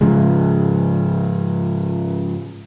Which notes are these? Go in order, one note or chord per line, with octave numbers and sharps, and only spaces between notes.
G#2 C#3 F3 G#3